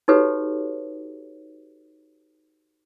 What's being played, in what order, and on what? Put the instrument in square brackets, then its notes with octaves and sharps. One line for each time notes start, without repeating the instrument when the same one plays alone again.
[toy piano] D#4 F#4 G4 A4 B4 C#5